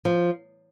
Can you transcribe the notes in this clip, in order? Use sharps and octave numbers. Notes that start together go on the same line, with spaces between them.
F3